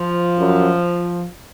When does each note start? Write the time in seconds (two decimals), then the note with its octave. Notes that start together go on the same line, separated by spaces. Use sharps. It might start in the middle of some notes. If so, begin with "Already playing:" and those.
Already playing: F3
0.39 F#2